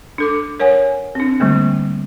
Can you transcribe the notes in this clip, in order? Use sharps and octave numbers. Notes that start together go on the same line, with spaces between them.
D4 A4 D6
A#4 C#5 F#5 G#5
C4 D4
D3 G3 A3 A#3